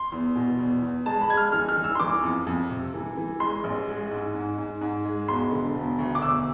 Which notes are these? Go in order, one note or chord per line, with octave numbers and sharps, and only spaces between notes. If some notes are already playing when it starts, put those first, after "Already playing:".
Already playing: C6
E2
B2
E2
E2
G#3 A5
B5
G#3 G#6
F6
E3 F6
F6
E3
E6
C6
E3 D6
F2
F2
C3
E3
E3
G#3 C6
A1
G#3
G#2
G#2
G#2
G#2
G#3
E1 C6
D3
E1
D2
D6
E1 E6